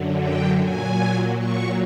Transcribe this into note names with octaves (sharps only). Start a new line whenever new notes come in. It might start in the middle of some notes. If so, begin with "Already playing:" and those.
Already playing: F#2 D3 F#3
G5
A#2 F#3 G#5
A#2 F#3 C#6